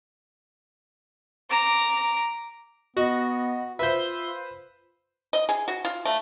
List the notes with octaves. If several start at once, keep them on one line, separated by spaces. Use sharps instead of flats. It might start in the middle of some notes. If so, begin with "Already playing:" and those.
A#5 D6
B3 F#4 D#5
F4 B4 C5 E5 G6
D#5
G#4
F#4
F4
A3